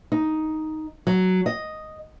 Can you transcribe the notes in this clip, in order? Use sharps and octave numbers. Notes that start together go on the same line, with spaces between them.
D#4
F#3
D#5